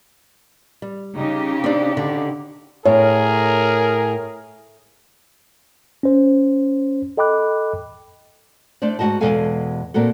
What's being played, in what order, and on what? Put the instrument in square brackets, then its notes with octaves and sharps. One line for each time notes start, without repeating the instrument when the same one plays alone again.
[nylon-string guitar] G3
[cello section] C#3 D#4 G4
[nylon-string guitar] C4 D4
D3
[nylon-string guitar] A2 [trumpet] G#4 [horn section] A#4 [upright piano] C#5
[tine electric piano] C#4 C5
A4 D#5 G5 B5 D6 F#6
[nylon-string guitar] A3 D4 C5 D5
G#2 F#3 F#4 D#5 A5
E2 B2 G#3 A4 F5 G#5
A#2 A#3 C4 F#4 A4